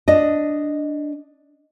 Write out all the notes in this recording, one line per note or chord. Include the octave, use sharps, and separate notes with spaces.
D4 D#5